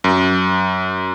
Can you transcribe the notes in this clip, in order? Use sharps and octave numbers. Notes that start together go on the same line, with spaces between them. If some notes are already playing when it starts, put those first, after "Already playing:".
F#2